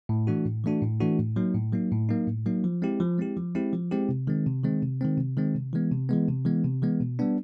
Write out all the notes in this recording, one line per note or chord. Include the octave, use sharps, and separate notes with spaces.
A2
E3 A3 D4 F#4
A2
E3 A3 D4 F#4
A2
E3 A3 D4 F#4
A2
F#3 A#3 D#4
A2
F#3 A#3 D#4
A2
F#3 A#3 D#4
A2
F#3 A#3 D#4
F3
G#3 C4 E4 G4
F3
G#3 C4 E4 G4
F3
G#3 C4 E4 G4
F3
G#3 C4 E4 G4
C3
D#3 G#3 C4
C3
D#3 G#3 C4
C3
D#3 G#3 C4
C3
D#3 G#3 C4
C3
E3 G#3 B3
C3
E3 G#3 B3
C3
E3 G#3 B3
C3
E3 G#3 B3
B2
G3 B3 D4